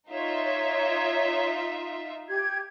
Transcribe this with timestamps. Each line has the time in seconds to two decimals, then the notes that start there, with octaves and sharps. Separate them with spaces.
0.11 D#4 F4 C#5 E5
2.29 G4 G#6